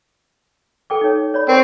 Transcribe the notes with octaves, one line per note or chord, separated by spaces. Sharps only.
A4 G5 D6
D#4 C#5
C#5 D5 B5
C4 A#4 C#6